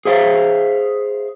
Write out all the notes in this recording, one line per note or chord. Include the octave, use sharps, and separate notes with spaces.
G#4 C5 E5 F5